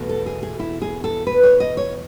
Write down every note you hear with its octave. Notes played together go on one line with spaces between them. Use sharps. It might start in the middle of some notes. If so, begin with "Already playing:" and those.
Already playing: E2 B2 A3
A4
G#4
G#4
E4
G#4
A4
B4
C#5
D#5
C#5